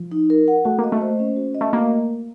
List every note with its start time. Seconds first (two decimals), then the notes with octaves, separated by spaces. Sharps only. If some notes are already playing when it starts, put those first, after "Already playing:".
Already playing: F3
0.12 D#4
0.30 A#4
0.48 F#5
0.65 A3 F#4
0.79 A#3 D#5
0.92 A3
1.01 C5
1.19 C#4
1.36 F#4
1.55 D#5
1.61 A3
1.72 A#3 F#4